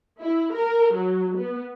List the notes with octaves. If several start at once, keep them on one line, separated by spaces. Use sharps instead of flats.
E4
A#4
F#3
B3